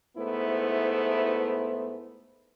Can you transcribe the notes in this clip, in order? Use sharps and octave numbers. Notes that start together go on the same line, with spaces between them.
G#2 A3 B3 E4 C5